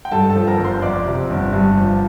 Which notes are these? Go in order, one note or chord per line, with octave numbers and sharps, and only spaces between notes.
G5
G2 A4 A5
A4 A5
F3
A#4 A#5
G1
C5 C6
F2 D5 D6
C3
G1
G2
F3